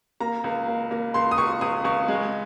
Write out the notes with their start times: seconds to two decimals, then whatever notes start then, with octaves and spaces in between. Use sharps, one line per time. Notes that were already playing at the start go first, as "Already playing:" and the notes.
0.20 A#3 A#5
0.44 C#2
0.68 A#3
0.91 A#3
1.14 C#2 C6
1.31 D#6
1.38 C#2 C#6
1.61 C#2 D#6
1.84 C#2 C#6
2.08 G#3